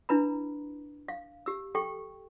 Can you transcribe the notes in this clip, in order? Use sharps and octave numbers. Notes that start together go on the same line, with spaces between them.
D4 E4 B4 A#5 B5
F5
G4 E6
G4 A4 G5 C#6